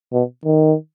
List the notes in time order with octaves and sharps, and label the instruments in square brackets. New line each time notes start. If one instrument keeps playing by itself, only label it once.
[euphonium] B2
D#3